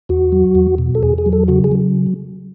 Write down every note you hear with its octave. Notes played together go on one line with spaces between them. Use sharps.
E2 F#4
F#3
E2
B2
A4
E2 G#4
G#4
F#3
A4
C#3 F#4
G#4
F#3